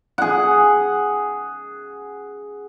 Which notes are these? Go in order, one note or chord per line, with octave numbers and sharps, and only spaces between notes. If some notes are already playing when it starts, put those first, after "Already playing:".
G#4 F#5